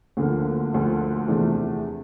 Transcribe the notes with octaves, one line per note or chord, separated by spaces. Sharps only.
D2 D3 F3 A#3
D2 D3 F3 A#3
E2 C3 F3 A3 D4